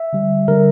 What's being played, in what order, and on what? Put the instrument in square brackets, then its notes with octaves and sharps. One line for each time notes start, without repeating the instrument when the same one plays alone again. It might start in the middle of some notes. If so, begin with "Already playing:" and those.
Already playing: [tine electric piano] E5
D3 G3
D3 G3 A#4